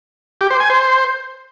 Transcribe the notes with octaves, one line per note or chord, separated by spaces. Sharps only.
G4
C5
G#5
C5